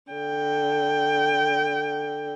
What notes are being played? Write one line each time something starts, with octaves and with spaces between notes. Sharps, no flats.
D3 G5